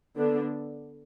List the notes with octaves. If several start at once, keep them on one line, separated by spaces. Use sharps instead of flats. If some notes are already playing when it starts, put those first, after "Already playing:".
D3 B3 D4